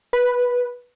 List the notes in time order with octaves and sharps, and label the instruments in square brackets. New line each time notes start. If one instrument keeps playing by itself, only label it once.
[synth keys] B4